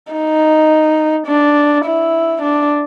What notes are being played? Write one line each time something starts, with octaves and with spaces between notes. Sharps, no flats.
D#4
D4
E4
D4